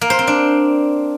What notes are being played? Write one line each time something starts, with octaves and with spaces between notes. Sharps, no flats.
A#3
C5
C4
D4